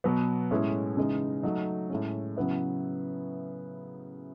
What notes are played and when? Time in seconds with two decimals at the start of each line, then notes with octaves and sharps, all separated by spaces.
0.04 B2 F#3 B3
0.51 A2 G#3 C#4 E4
0.97 C#3 E3 G#3 D#4
1.43 F#3 A3 D#4
1.90 A2 G#3 C#4
2.36 C#3 F#3 B3 E4